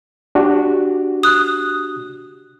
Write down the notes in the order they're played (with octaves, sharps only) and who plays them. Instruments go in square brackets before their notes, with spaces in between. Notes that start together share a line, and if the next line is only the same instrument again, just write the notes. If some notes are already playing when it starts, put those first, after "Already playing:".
[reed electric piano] D4 F#4 G4
[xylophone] D#6 F#6